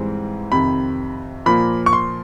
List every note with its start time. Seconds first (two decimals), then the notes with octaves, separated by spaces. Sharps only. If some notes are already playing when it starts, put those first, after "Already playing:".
Already playing: G#2 E3 G3 C4
0.52 F2 C3 D#3 B5
1.46 A#2 F3 A#3 B5
1.86 C#6
1.93 C6